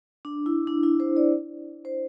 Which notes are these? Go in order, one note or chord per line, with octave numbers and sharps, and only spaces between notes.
D4
E4
D4
E4
C5
D5
C5